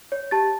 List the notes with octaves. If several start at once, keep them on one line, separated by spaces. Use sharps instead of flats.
C#5
G4 A5 A6